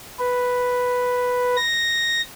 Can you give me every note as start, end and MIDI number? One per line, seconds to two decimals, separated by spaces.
0.19 1.57 71
1.57 2.22 94